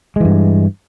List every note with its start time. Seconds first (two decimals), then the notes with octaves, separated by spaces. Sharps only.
0.16 G#3
0.20 E3
0.25 G2